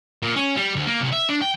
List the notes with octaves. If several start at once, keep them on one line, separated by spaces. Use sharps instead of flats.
A#2
C#4
G3
D2
A#3
C2
E5
D4
G5